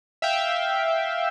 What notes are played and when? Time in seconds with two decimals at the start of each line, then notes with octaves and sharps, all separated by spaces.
0.22 E5 F5 G5